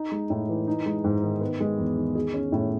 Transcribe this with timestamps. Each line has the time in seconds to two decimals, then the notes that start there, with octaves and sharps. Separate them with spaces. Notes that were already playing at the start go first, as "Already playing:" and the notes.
Already playing: D#4
0.12 G#3
0.30 A2
0.49 E3
0.67 D#4
0.86 G#3
1.04 G#2
1.23 D#3
1.41 B3
1.60 G#3
1.78 E2
1.97 D#3
2.15 G#4
2.34 C#4
2.52 A2